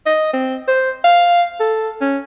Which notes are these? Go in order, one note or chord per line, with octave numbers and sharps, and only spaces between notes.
D#5
C4
C5
F5
A4
C#4